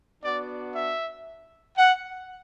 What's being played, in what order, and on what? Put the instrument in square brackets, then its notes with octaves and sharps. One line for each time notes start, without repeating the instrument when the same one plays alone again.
[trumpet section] B3 D4 F#4 D5
E5
F#5